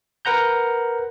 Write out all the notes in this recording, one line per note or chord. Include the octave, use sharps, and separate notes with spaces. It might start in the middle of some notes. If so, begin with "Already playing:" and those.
A#4 B4 F#5 A#5 G6